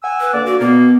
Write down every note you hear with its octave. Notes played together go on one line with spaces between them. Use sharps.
F#5 G#5 E6
B4
D3 A#3 D5
F#4
B2 A#3 B3